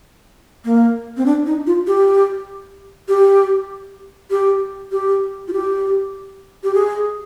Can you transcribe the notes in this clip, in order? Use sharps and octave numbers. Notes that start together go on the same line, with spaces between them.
A#3
C4
D4
D#4
F4
G4
G4
G4
G4
F4
G4
G4
G#4